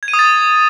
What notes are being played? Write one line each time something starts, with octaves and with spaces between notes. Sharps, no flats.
G#6
D#7
D#6
A6